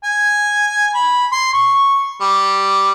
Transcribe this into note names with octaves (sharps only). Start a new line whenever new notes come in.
G#5
B5
C6
C#6
G3